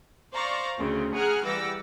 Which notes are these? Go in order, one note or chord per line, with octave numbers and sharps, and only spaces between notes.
C5 D5 F5 A#5 C#6
D2 C#3 C4
G#4 F#5 G#5 A#5 F6 F#6
E3 G3 F#5 D6 E6 A#6